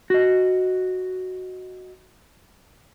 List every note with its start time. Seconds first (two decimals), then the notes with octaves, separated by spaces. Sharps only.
0.10 F#4 D#5